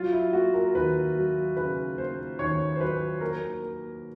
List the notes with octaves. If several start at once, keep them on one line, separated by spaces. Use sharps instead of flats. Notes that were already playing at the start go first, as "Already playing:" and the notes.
Already playing: F#3 F4
E4
A#3 F#4
A#4
D#2 B4
F#3
C#3 B4
A#3 C5
D#2 C#5
C5
F#3 B4
A#3 A#4
A#3